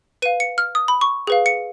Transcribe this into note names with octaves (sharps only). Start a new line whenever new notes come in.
B4 F5 D#7
C#7
F6
D#6
B5
C#6
G#4 B4 F5
C#7